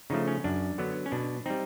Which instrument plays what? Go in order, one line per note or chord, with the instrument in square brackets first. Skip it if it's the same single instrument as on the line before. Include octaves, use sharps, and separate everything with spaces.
[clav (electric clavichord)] C#3 F3 A3 D#4
C#4
F#2 D4
D3 F#3 B3
C#4
B2 D4
G3 C4 D#4